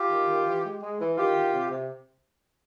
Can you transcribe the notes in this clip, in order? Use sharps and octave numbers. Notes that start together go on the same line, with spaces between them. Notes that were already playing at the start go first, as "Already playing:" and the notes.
Already playing: F4 G4
D#3
D#3
E3
G#3
G#3
E3
D#3 F4 G4
D#3
C3
C3